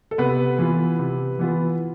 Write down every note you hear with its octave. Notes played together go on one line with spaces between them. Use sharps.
A4
C3 B3 B4
E3 B3 F4
C3
E3 B3 F4